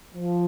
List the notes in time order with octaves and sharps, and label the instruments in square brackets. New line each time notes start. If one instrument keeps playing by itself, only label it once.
[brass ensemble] F3